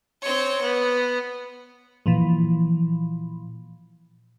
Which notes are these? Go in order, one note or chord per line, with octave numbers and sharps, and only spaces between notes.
C4 C#5
B3
A#2 E3 F3